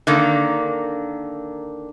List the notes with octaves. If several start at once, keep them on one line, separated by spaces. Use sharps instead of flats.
D3 D#3 A#3